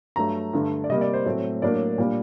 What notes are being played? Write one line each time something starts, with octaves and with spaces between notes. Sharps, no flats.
G2 F#3 A3 A#5
G2 D3 A3
D5
C3 G3 A#3 D#5
D5
C5
A2 F#3 A3 C4
A2 F#3 A#3 D4 D5
A#2 G3 A#3 D4